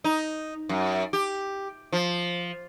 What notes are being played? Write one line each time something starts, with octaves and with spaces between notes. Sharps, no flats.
D#4
F#2
G4
F3